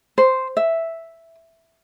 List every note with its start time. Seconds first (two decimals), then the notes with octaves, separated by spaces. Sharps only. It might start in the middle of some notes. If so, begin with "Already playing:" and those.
0.18 C5
0.57 E5